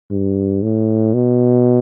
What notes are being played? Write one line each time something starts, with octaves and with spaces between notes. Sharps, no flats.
G2
A2
B2